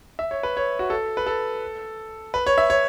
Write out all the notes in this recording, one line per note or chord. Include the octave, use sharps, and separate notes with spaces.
E5
C#5
B4
C#5
F#4
A4
B4
A4
B4
C#5
E5
C#5